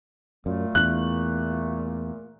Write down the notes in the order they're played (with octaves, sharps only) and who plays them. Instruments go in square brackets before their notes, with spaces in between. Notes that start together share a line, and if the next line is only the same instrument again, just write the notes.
[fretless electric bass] F#2 [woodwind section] A#2 A3
[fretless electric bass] E2 [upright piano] F#6